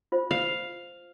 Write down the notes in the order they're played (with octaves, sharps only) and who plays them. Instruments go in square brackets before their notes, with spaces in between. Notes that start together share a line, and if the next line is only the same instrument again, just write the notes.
[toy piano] F4 C5
[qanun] F5